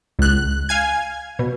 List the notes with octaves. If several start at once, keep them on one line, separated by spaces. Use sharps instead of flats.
C#2 F#6
F5 G#5 G#6
B2